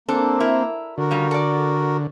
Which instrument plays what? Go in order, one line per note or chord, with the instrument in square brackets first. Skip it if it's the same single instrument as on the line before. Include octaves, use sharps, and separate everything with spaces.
[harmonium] A#3 [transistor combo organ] C4 [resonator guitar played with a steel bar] D4 A4
[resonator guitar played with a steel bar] E4 A#4
[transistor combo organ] D3 [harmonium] F#4 A#4
[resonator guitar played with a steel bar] C#3 G3 F4
A4 D5